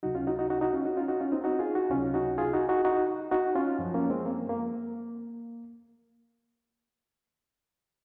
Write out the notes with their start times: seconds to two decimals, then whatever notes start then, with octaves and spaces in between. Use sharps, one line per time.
0.03 C#2 C3 F#3 D#4 F#4
0.15 C#4 F4
0.27 D#4 F#4
0.39 D#4 F#4
0.50 D#4 F#4
0.61 D#4 F#4
0.73 C#4 F4
0.85 D#4 F#4
0.97 C#4 F4
1.08 D#4 F#4
1.20 C#4 F4
1.32 C4 D#4
1.44 D#4 F#4
1.59 F4 G#4
1.75 D#4 F#4
1.91 C#2 C3 F#3 C#4 F4
2.14 D#4 F#4
2.38 F4 G#4
2.53 D#4 F#4
2.69 D#4 F#4
2.85 D#4 F#4
3.31 D#4 F#4
3.55 C#4 F4
3.79 F#2 F3
3.94 A#3 C#4
4.10 G#3 C4
4.26 A#3
4.49 A#3